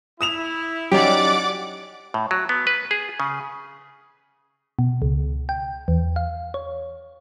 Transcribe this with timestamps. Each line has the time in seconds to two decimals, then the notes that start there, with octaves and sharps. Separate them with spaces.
0.21 E4 D#6 E7 F7
0.92 F#3 C#4 D#4 G4 D5 F#5 D6
2.14 A2
2.31 F#3
2.49 B3
2.67 B4
2.91 G#4
3.20 C#3
4.79 B2
5.02 C#2
5.49 G5
5.88 E2
6.16 F5
6.54 C#5